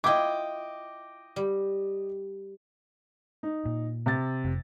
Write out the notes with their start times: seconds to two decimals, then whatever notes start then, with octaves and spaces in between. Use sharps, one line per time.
0.04 E4 F4 D#5 G5 D6
1.36 G3
3.43 D#4
3.65 A#2
4.06 C3 A6
4.44 F1